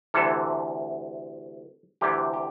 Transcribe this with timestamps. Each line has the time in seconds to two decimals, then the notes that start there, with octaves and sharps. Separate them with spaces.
0.14 D2 C3 E3 A4
2.01 D2 C3 E3 G4
2.33 G4